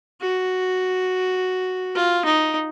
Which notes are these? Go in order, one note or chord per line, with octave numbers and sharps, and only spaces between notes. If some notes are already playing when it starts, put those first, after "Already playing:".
F#4
F4
D#4